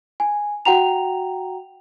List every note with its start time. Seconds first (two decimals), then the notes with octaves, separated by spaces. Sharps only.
0.20 G#5
0.65 F#4 F#5 G5 A#5 F7